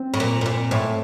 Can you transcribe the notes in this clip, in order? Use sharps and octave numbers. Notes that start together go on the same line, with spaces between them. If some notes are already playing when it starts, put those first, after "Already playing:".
Already playing: C4
A2
A#2
A2
A#2
A2